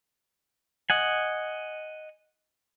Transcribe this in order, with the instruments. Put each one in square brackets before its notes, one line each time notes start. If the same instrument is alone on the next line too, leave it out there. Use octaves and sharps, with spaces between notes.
[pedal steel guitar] D#5 F#5 G#5